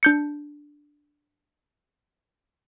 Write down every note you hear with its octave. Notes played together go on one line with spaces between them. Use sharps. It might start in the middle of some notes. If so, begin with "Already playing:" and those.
D4 G6 C#7